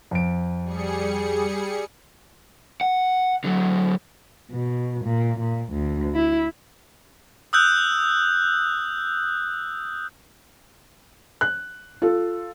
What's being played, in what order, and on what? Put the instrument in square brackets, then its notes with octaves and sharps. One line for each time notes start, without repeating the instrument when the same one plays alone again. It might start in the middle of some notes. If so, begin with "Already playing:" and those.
[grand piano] F2 D7
[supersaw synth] G3 G#4 C#7
[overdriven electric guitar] F#5
D3 F#3
[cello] B2
A#2
A#2
D2
E4
[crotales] D#6 E6 F#6 G6
[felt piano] F#6
F4 A4